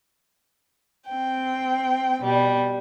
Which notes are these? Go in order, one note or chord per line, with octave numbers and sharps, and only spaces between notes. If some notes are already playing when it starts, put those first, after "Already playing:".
C4 G5
B2 G3